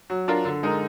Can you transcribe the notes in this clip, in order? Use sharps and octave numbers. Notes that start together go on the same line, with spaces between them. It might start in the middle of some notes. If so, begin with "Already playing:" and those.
F#3
D4 F4 A#4
D3
G#3 D#4 A#4